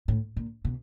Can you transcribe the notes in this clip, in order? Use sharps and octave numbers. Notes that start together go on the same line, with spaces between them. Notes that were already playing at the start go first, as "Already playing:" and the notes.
A2
A#2
B2